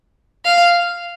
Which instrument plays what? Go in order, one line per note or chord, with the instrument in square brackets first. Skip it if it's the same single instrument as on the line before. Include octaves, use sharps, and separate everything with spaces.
[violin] F5